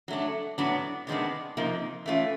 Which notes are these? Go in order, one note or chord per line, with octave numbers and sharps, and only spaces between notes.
F#3 A3 D4
A2 F#3 B3 D4
C3 D#3 G#3 B3 D4
C3 F3 A#3 D#4
E3 A3 C#4 F4